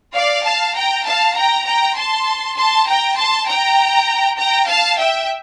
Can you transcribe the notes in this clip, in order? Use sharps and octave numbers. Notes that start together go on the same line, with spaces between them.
D5 F5
F5 A5
G5 A#5
F5 A5
G5 A#5
G5 A#5
A5 C6
A5 C6
G5 A#5
A5 C6
G5 A#5
G5 A#5
F5 A5
E5 G5